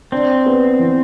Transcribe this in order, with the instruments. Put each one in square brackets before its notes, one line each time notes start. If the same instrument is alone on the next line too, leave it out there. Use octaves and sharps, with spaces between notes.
[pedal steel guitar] C4 [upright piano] D4
[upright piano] B3
E3